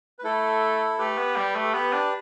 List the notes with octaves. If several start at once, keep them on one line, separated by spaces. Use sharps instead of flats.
B4
A3 E4 A4
A3 G4 B4
B3
G3
A3
A4
B3 G4 B4
D4